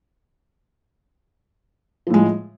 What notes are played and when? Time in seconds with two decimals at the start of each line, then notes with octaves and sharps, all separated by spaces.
2.07 F3
2.10 A2
2.14 G#3